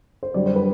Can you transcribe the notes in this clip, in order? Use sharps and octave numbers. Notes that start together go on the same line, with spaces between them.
C5
F#2 D3 G3 D5
C5
B4